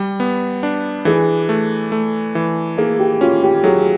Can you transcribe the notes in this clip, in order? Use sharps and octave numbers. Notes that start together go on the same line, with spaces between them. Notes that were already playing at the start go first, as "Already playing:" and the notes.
Already playing: G3
B3
D4
E3 G#4
A3
A3
E3
A#3 G#4
G4
C#4 F4
G4
F#3 G#4